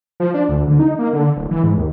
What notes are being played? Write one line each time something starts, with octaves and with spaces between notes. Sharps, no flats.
F3
D4
D2
D3
D#4
A#3
D3
D1
E3
G#2
D#2